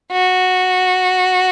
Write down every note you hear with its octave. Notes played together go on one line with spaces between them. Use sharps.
F#4